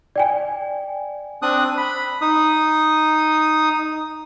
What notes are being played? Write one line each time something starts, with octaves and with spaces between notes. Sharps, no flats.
D5 G5 G#5
C4 D4 D#6 F#6
B5
D#4 D#6